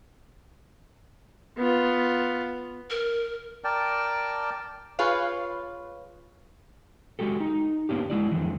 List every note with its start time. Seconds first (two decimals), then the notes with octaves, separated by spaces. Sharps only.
1.57 B3 F4
2.90 A#4
3.64 A#4 D5 G5 A5
4.99 F4 G#4 B4 C#5 F5
7.19 G#3 F#4 G4 A4
7.40 D#4
7.89 A#3 B3 C#4 D4 G4
8.10 G#3 E4 D5
8.31 F2 B2 D3 E3